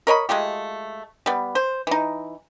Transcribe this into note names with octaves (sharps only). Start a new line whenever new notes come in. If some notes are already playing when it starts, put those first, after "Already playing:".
A#4 C#5 D#5 B5
G#3 A3 F4 G4
G3 B3
C5
E3 D#4